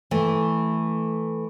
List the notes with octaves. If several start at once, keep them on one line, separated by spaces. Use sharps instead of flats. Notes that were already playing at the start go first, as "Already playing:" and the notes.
E3 A3